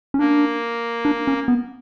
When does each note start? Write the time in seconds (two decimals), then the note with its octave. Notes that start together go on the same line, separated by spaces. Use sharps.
0.14 C#4
0.19 A#3 D4
1.05 D4
1.27 C#4
1.48 B3